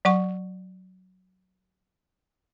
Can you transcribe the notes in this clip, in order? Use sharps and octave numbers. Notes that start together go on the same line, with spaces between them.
F#3 F#5 C#6